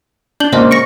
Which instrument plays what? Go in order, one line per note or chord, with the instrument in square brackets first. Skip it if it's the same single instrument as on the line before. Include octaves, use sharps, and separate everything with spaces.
[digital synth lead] D4 [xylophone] G6 F#7 G7
[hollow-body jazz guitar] C#2 A#2 C#3 [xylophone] C5 D#5
[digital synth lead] C#6 [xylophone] A#6 C#7 D7